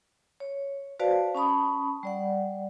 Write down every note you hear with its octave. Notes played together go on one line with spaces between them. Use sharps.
C#5
F#4 B4 C5 D5 F5 A5
C#4 A5 B5 D#6
G3 D5 F#5